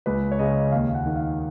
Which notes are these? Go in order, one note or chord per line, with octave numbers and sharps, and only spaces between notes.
C#2 B4
C#5
C#3 D#5
D#2 F5
F#5
D#3
F5